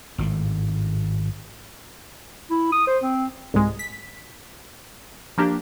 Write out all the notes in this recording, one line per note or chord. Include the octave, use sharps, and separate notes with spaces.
G#1 A2
E4
D#6
C5
C4
C2 G#2 G#3
B6
F3 A#3 D4 G4